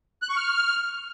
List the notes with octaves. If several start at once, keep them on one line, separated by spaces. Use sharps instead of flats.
F#6
C#6
F6